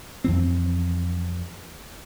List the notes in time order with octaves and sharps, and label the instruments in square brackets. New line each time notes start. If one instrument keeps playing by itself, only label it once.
[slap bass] F2 E3 C4